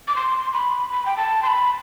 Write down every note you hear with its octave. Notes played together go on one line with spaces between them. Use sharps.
D6
C6
B5
B5
G5
A5
C6
B5